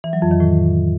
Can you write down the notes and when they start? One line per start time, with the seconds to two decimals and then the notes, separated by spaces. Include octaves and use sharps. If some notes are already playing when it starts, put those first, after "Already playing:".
0.04 E3
0.13 F#3
0.22 F2
0.31 D#3
0.40 A2